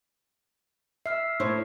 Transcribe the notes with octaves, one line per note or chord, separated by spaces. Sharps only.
E5 E6 F6 C7
A2 E4 C5 C#5